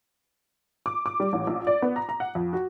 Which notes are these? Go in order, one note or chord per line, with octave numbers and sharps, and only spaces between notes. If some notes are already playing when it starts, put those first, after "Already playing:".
D6
D6
G3
A1
A#1
D5
B3
A#5
A#5
F#5
F2
F#4